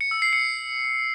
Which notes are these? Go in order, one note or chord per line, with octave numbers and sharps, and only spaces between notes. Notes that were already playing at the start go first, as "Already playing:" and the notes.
C#7
E6
C7
C#7